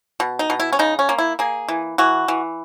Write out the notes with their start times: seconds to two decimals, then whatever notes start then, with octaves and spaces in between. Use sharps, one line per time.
0.20 B2
0.39 D#4
0.50 B2
0.60 E4
0.73 C#4
0.79 C#3 D#4
0.99 C#4
1.09 A#3
1.18 E4
1.39 A#3 G#4
1.69 E3
1.98 E3 F#4
2.28 E3